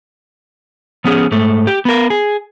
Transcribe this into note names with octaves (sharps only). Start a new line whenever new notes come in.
F3 B3 C#4 G#4
G#2 A3
G4
B3 A#4
G#4